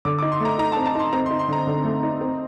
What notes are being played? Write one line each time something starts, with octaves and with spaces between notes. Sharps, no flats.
D3 D6
D6
D#4
C6
A3 A#5
D#4 A#5
A5
C4
A5
D#4 C6
C4 A#5
C6
D#4
C6
D3 A#5
D3
A3
D#4
C4